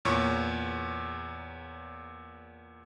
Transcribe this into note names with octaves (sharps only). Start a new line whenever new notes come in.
E2 A#2 C#5 C#6